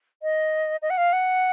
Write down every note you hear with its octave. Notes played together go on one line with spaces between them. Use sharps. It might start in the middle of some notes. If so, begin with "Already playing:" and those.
D#5
D#5
F#5
F5
F#5